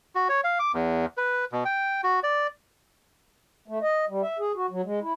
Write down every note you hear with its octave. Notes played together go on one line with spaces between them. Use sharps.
F#4
C#5
F5
D6
E2
B4
B2
G5
F#4
D5
A3
D#5
G3
E5
G#4
F#4
F#3
G#3
E4